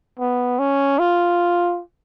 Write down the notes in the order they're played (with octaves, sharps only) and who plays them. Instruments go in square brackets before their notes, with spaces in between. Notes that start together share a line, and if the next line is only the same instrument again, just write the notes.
[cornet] B3
C#4
F4